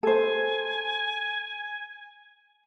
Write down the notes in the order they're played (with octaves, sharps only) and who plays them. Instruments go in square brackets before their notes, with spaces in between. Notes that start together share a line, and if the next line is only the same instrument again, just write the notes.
[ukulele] A4 C5 [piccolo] G#5